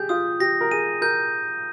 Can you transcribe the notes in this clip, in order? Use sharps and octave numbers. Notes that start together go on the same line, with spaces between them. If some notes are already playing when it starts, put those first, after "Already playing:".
Already playing: G4 G#4 G6
F4 D#6
G4 A#6
A#4
G#4 D#7
A#4 G6